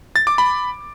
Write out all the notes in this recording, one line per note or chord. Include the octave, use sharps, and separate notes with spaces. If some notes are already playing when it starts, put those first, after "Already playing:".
A6
D6
B5